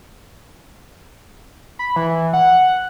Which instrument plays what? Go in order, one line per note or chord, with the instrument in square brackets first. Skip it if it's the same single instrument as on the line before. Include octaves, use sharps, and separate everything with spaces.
[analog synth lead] B5
E3
F#5